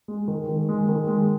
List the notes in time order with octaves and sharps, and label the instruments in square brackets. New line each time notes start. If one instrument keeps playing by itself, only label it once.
[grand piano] G#3
D#3
D#3
G#3
D#3
G#3